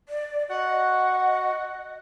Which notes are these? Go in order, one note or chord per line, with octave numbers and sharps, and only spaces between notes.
D5
F#4 D#5 F#5